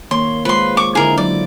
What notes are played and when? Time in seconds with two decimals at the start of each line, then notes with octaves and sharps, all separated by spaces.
0.11 D#3 A#3 C#5 C6
0.45 G#3 F4 B4 C5 C6
0.77 C#6 D6
0.95 D3 D#4 E4 G#4 A#4
1.18 F#3 D5